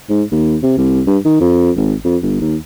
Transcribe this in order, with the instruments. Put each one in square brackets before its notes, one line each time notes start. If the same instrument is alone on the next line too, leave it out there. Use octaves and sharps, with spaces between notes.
[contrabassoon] G#2
D#2
C3
C2
G2
D#3
F2
G#1
F2
G1
D#2